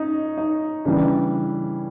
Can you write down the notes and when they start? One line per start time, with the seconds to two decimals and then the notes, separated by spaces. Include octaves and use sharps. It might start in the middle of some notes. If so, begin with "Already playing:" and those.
Already playing: C#4 D#4
0.38 D#4
0.85 C#3 E3 G3 D4